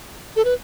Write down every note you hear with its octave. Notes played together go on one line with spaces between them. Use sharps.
A4
B4